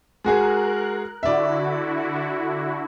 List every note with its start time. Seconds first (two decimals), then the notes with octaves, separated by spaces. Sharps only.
0.24 G#3 F#4 G#4 A#4 F#6
1.23 D3 E4 F#4 D5 E5